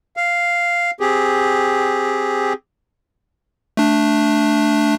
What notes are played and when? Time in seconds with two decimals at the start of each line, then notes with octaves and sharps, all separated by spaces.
0.17 F5
1.00 C4 G4 G#4
3.77 A3 D4